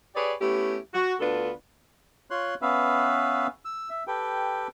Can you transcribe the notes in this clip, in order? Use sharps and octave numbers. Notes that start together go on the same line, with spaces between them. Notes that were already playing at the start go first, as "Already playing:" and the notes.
G4 G#4 B4 C#5 D5
A3 B3 C#4 E4 G4
F#4
D2 B3 D4 F4 A4 B4
F4 C#5 C6 F#6
B3 C#4 B4 E5 F5
E6
E5
G4 A4 B4 G5